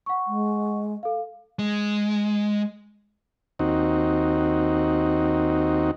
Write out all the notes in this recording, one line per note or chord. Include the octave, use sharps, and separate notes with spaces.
F#5 C#6
G#3
A4 F5
G#3
D#2 C4 D#4 F#4